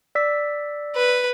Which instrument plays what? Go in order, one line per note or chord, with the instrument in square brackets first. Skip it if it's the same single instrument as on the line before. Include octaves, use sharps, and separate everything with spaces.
[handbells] D5 E6 B6
[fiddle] B4